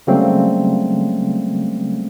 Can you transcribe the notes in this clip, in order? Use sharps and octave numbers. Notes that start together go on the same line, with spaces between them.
C#3 F#3 G3 A3 A#3 C4